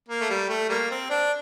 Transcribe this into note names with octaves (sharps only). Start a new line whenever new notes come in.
A#3
A3
G3
A3
G3 A#3
C4
D4